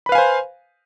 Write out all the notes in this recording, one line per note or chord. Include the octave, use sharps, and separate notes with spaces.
B4 C5 F5 G#5 B5